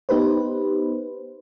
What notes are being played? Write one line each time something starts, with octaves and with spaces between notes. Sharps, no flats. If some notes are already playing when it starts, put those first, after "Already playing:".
B3 D#4 G4 B4 C5